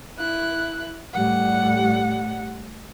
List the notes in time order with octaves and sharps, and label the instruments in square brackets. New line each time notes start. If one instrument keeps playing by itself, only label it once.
[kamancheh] E4 F#6
[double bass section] A2 G3 [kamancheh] F#5